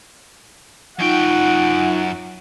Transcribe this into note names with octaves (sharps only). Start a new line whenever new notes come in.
F#2 D#4 F4 F#5 G5 C#6